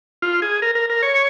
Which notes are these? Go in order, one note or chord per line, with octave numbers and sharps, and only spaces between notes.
F4
G#4
A#4
A#4
A#4
C#5